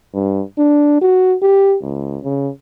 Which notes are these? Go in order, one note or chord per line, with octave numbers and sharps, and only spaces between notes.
G2
D4
F#4
G4
C#2
C#3